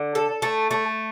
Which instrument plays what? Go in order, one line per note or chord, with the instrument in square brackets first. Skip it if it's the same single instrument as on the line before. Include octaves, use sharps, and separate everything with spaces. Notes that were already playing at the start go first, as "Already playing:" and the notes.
Already playing: [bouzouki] D3
A4
A3
A3